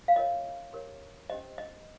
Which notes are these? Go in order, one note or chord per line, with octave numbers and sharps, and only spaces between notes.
F5
F4 A#4 C#5 D#5
G4 A#4 C#5
C#4 G4 C5 D#5
D#5